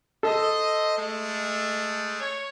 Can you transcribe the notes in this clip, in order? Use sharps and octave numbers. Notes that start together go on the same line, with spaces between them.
A4 C5 D#5
G#3 A3
C#5